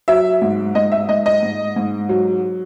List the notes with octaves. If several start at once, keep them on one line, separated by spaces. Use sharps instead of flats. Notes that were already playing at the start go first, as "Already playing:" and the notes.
F#3 E5
G#2
G#2 D#5
E5
G#2 D#5
D#5
G#2
G#2
F#3